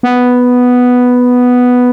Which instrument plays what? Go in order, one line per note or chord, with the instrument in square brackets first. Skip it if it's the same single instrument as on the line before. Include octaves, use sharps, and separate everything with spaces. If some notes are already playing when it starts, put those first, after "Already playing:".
[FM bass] B3